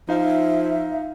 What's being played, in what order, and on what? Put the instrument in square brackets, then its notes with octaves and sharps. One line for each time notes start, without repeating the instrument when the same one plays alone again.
[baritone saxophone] F3 [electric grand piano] D#4 F5 [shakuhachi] E5